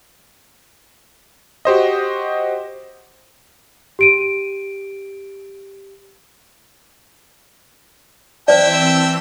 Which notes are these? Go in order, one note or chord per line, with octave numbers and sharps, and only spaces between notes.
F#4 G4 C5 D#5
G4 D7 D#7
E3 C4 C5 D5 E5 G5 A5 E6